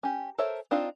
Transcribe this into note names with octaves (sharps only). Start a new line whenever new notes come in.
C#4 G4
A4 A#4 C5 C#5 E5
C4 D4 D#4 F4 F5